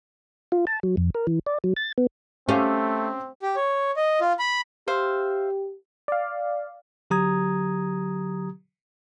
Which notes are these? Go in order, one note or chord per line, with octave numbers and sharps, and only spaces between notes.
F4
A5
F#3
F2
A#4
E3
D5
F#3
A6
B3
A3 C4 C#4 G4 C5 F5
G4
C#5
D#5
F4
B5
G4 C5 E5 F5
D5 F5
D3 F#3 G4 A#5 D#6 G#6